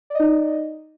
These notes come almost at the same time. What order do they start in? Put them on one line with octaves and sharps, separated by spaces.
D5 D#5 D#4